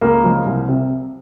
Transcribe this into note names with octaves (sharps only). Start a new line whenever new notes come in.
C#2 A#3 A#4
C#3 F3 G#3
C2
C3